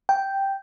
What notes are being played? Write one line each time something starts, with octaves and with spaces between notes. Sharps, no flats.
G5